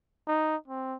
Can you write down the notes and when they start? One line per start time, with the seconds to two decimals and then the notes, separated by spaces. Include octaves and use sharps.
0.27 D#4
0.68 C4